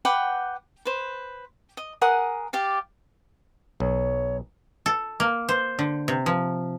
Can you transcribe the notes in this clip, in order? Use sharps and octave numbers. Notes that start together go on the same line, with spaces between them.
B4 F#5 G5 D6
B4 C5
D#5
G#4 A#4 F#5 D#6
G4 D5 F5
B1 C#5
A4
A#3
C5
D3
C3
F3